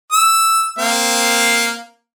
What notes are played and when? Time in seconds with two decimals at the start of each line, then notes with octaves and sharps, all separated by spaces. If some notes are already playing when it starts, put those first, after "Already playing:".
0.12 E6
0.78 A#3 C4 F5